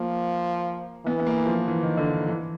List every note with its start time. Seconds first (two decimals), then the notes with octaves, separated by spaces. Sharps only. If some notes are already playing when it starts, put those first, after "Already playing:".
Already playing: F3 A#3
1.05 E3 B3
1.19 B3
1.27 A#3
1.46 F3
1.68 E3
1.83 D#3
1.97 D3
2.28 E3